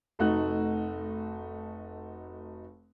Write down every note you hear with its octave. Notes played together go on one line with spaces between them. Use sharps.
F1 A3 D#4 F#4 F#6